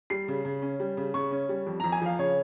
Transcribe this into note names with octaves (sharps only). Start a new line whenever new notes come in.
G3 C7
C#3
C#3
C#4
G3
C#3
C#3 C#6
C#4
G3
F2
F2 A#5
G#5
F3 F5
C#3 C#5